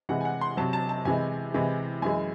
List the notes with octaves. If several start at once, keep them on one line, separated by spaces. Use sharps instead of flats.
C3 E3 G#3 F#5
G#5
F#5
C6
C3 F#3 A5
A5
A5
C3 E3 G#3 G#5
C3 E3 G#3
F#2 E3 G#3 G#5